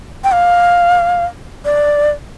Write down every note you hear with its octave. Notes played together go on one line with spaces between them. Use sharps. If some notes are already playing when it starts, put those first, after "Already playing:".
G5
F5
D5